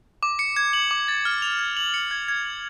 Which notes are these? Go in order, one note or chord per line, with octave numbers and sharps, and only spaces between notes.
D6
C#7
G#6
F#7
D6
A6
F6
F7
G#6
F#7
C#7
G#6
G#6
F#7